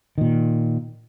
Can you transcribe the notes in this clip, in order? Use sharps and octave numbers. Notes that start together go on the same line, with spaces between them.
A#2 D#3